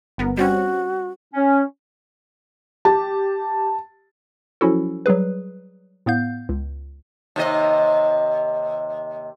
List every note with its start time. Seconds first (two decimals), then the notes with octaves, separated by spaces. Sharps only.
0.18 G1 B3 A#4
0.37 G3 C4 C#4 F#4
1.34 C#4
2.85 G4 A5
4.61 F3 F#3 C#4 E4 F#4 A4
5.06 F#3 G3 G#4 B4
6.06 A2 B3 F5 G6
6.49 C#2
7.36 D#2 C3 D#5